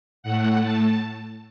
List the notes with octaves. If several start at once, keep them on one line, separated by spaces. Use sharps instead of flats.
A2 A3 F#5
A5